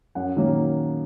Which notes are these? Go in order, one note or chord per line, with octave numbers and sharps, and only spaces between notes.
F#2 F#5
D#3 F#3 A#3 C#4